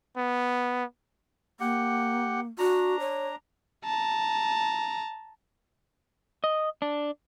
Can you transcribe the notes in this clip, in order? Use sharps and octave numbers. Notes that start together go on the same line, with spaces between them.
B3
A#3 G4 F#5
D4 F#4 A#5
C#5
A5 A#5
D#5
D4